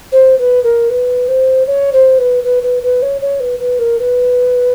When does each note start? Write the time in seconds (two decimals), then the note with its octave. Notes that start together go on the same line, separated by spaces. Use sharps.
0.12 C5
0.39 B4
0.64 A#4
0.90 B4
1.28 C5
1.67 C#5
1.93 C5
2.18 B4
2.44 B4
2.63 B4
2.83 B4
3.02 C#5
3.21 C#5
3.40 B4
3.59 B4
3.79 A#4
3.99 B4